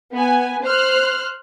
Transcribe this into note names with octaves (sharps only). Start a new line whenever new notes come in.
B3 G#5
C5 F6 F#6